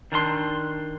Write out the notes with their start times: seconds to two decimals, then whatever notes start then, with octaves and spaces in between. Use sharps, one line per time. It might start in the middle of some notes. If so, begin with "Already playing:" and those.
0.12 D#3 D4 F#5 C6